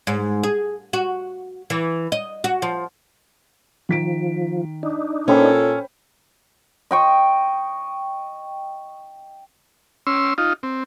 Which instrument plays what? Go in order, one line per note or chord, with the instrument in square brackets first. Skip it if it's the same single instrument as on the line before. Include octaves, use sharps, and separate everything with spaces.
[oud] G#2
G#4
F#4
E3
D#5
F#4
F3
[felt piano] D#3 B6 D7 [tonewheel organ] F3
[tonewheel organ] D4 D#4
[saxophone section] A#2 A4 [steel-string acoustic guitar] C#4 [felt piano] C5 G5 B5
[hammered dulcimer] D#5 G5 C#6
[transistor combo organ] C#4 C6 E6
D#4 F4
C4